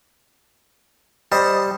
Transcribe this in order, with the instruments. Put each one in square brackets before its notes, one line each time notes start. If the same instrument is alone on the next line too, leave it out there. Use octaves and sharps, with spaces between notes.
[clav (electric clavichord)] G3 [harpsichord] C5 D#5 A5